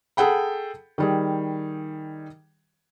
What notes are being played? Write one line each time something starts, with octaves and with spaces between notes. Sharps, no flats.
G#4 A4 F#5 G5 B5
D#3 G3 G#4